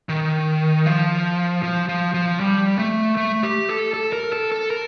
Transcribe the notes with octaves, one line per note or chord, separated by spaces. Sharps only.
D#3
F3
F3
F3
F3
G3
A3
A3
G4
A4
A4
A#4
A4
A4
A#4